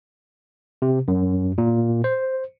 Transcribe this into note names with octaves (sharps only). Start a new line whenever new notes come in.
C3
F#2
A#2
C5